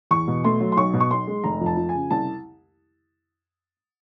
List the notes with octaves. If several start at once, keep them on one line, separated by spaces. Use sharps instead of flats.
E2 C#6
B2
A3 C6
F#3
C6
B1 C#6
B2
C#6
B1 C6
G#3
F1 A#5
F2
A5
F3
G#5
C#3
C2 A5